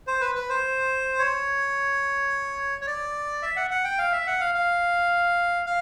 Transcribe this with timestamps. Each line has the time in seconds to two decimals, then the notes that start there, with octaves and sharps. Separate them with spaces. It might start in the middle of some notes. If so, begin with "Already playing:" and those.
0.07 C5
0.21 B4
0.35 B4
0.49 C5
1.19 C#5
2.81 C#5
2.87 D5
3.42 E5
3.56 F#5
3.71 F#5
3.84 G5
3.98 F5
4.12 E5
4.27 F#5
4.40 F5
4.55 F5
5.66 F5